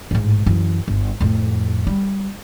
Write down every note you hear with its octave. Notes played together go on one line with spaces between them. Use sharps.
A1 G#2
F#2 E3
G1
F2 A2
G3